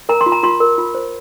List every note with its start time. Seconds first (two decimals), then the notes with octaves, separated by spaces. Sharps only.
0.09 A#4 A#5
0.21 C6
0.26 F4
0.32 A#5
0.43 F4 C6
0.60 A#4
0.78 F4
0.95 C5